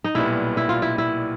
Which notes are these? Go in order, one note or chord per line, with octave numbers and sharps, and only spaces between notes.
D#4
B1 A#2 G3 B3 E4
E4
F4
E4
E4